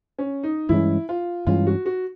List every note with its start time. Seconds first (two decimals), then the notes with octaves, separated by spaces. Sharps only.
0.19 C#4
0.43 D#4
0.69 G2 E3 G#3 C#4 E4
1.09 F4
1.47 G2 E3 G#3 C#4 F4
1.67 F#4
1.86 F#4